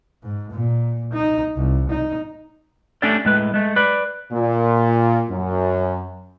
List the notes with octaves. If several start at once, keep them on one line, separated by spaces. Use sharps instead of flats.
G#2
A#2
D#4
C2
D#4
A3 C#4 D4 G4 A4 D5
A2 G#3 B4
G#3 A3
B4 D5
A#2
F#2